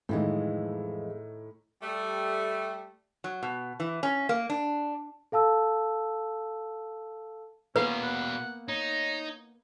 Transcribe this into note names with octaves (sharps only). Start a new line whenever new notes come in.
F2 A2 D#3 E3 G#3
G3 A3
F#3
B2
E3
C#4
A#3
D4
A4 F5 A5 E6
B2 A#3 B3 C#4 B4 F5
F#5
D#4 C#5